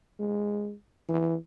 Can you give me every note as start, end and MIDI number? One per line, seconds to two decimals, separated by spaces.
0.19 0.74 56
1.09 1.36 52